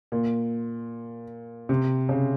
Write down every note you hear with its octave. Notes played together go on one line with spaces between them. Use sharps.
A#2
C3
C#3